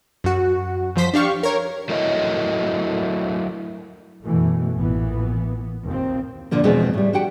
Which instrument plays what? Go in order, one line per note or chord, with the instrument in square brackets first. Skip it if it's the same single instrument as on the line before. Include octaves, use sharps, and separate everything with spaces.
[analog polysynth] F#2 F#4
F#2 F3 C5 B6
D4 G4 F5 C#6
A#4 C#5
[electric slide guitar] F#3 A3 E4 A#4 C#5 D#5
[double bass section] F#2 B2 E3 A3
A1 A#2 E3 B3
D#2 A#2 C4
[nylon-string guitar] A#2 D3 F3 A#3
E2 B2 F3 G#3 C4 G#4
A2 G3
F#4 G4 F#5 G5